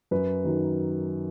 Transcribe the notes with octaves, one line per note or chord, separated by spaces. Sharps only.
F#2 B4
D#3 F#3